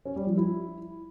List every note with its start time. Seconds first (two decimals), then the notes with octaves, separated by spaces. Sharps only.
0.05 C#4
0.16 G3
0.27 F3
0.37 E4